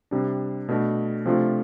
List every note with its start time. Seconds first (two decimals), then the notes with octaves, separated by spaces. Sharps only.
0.11 C3 G3 D4
0.69 B2 A3 D4
1.25 C3 F3 A3 D4 F4